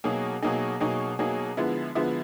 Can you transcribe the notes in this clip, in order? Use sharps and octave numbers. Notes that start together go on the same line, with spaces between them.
B2 F#3 A#3 D#4 G#4
B2 F#3 A#3 D#4 G#4
B2 F#3 A#3 D#4 G#4
B2 F#3 A#3 D#4 G#4
D3 F3 G#3 B3 E4
D3 F3 G#3 B3 E4